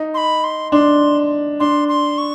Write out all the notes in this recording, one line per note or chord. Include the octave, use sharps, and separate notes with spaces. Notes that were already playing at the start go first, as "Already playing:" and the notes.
Already playing: D#4
C6
B5
C6
D4 C6
D4 C6
C6
C#6